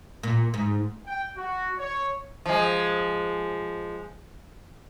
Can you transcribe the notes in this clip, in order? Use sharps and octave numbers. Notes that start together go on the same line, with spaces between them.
A#2
G#2
G5
F#4
C#5
F3 G#3